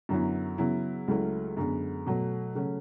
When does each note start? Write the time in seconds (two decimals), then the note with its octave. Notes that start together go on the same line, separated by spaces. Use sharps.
0.09 F#2 D3 F#3 B3 E4
0.58 C#3 F#3 B3 E4
1.08 C#2 C#3 F#3 A3 E4
1.57 F#2 D3 G#3 B3
2.06 B2 F#3 A3
2.55 C#3 F#3 A3 C#4